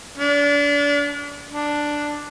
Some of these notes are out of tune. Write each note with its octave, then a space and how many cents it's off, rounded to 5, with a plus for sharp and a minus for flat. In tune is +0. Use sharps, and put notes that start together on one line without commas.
D4 -30
D4 +0